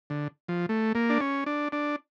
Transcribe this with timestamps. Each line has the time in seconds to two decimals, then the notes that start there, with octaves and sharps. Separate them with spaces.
0.10 D3
0.49 F3
0.69 A3
0.95 A#3
1.10 D4
1.21 C#4
1.46 D4
1.72 D4